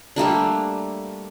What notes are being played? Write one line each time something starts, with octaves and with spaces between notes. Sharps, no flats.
G3 A3 A#3 D4